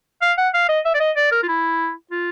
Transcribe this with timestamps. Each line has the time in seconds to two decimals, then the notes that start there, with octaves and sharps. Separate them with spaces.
0.22 F5
0.38 F#5
0.54 F5
0.69 D#5
0.85 E5
0.94 D5
1.00 D#5
1.16 D5
1.32 A#4
1.43 F4
1.48 E4
2.11 F4